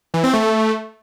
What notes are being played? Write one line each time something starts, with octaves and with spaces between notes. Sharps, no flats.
E3
C4
A3